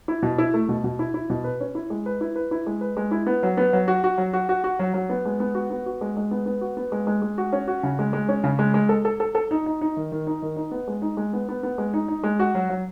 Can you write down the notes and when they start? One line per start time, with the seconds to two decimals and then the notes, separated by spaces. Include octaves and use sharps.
0.08 E4
0.22 B2
0.38 E4
0.54 A3
0.69 B2
0.84 B2
0.99 E4
1.14 E4
1.30 B2
1.44 B4
1.60 C#4
1.75 E4
1.90 G#3
2.06 B4
2.21 E4
2.36 B4
2.51 E4
2.66 G#3
2.81 B4
2.97 G#3
3.11 E4
3.27 B3
3.43 F#3
3.57 B3
3.73 F#3
3.88 F#4
4.04 F#4
4.18 F#3
4.33 F#4
4.49 F#4
4.64 F#4
4.79 F#3
4.94 F#3
5.09 B3
5.25 G#3
5.40 B3
5.55 F#4
5.70 B3
5.86 F#4
6.01 G#3
6.17 G#3
6.31 B3
6.46 B3
6.61 F#4
6.77 B3
6.92 G#3
7.07 G#3
7.22 G#3
7.38 F#4
7.53 C#4
7.68 F#4
7.83 C#3
7.99 G#3
8.13 G#3
8.29 C#4
8.44 C#3
8.59 G#3
8.74 G#3
8.89 A4
9.05 A4
9.20 A4
9.35 A4
9.51 D#4
9.66 D#4
9.81 D#4
9.97 D#3
10.12 D#3
10.27 D#4
10.42 D#3
10.56 D#4
10.71 B3
10.88 G#3
11.02 D#4
11.17 G#3
11.33 B3
11.49 B3
11.63 B3
11.78 G#3
11.94 D#4
12.08 D#4
12.23 G#3
12.39 F#4
12.55 F#3
12.69 F#3